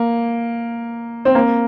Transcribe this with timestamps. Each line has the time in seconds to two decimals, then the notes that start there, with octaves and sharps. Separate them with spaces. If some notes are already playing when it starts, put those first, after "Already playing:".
Already playing: A#3
1.25 C4
1.35 A#3